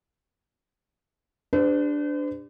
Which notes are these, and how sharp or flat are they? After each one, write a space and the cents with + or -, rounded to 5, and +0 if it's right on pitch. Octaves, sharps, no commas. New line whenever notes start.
D4 +0 G4 +30 C5 -45